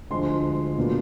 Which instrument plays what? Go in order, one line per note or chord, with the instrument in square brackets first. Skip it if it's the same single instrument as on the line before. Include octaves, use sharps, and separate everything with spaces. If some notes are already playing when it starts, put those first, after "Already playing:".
[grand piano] D2 D3 F3 G#3 C6
A#2 F#3 B3 D4